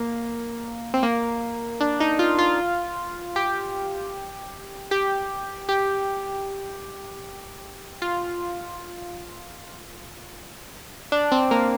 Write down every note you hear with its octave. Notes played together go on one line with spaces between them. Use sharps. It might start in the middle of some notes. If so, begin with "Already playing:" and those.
Already playing: A#3
C4
A#3
D4
D#4
F4
F4
G4
G4
G4
F4
D4
C4
A#3